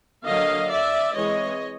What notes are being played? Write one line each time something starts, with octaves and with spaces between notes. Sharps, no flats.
D3 F#3 A#3 D#5 F5
D5 E5
E3 G#3 C4 C#5 D#5